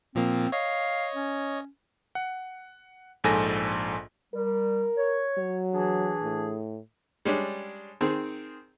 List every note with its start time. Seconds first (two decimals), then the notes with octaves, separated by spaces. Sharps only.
0.15 A#2 F3 A#3 C4
0.52 C#5 D#5 F5
1.14 C#4
2.15 F#5
3.24 A#1 G#2 A4 G#5 A#6
4.34 G3 A#4
4.97 C#5
5.38 F#3
5.73 E3 D4 G#4
6.23 A2
7.25 G3 G#3 C#4 D4
8.01 D#3 C4 G#4